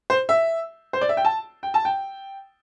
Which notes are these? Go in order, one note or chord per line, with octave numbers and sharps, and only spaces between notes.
C5
E5
C5
D5
E5
G5
A5
G5
A5
G5